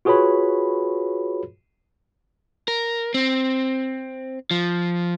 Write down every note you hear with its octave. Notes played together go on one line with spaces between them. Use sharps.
F4 F#4 G#4 B4 C#5 B5
A#4
C4
F3